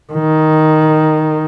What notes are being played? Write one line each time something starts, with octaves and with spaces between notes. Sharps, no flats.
D#3